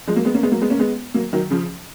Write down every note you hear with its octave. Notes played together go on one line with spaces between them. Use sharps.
F3 G#3
F#3 A#3
G#3 B3
A#3 C#4
G#3 B3
F#3 A#3
G#3 B3
A#3 C#4
G#3 B3
F#3 A#3
D#3 F#3
C#3 F3